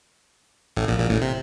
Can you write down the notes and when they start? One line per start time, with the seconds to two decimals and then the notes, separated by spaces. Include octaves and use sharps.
0.77 A1 A2
0.88 A#1 A#2
0.99 A#1 A#2
1.10 A1 A2
1.21 C3